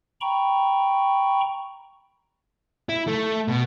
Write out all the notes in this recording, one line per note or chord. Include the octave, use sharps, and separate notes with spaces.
G5 A#5 B5 C#6
E4
A3
B2